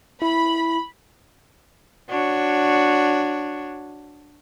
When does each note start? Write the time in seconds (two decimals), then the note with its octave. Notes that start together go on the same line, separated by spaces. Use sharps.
0.22 E4 B5
2.09 D4 F#4 C#5